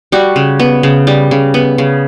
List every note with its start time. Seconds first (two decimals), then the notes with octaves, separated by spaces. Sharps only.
0.12 G3 F#4
0.36 C#3
0.59 B3
0.83 C#3
1.07 G3
1.31 C#3
1.54 B3
1.78 C#3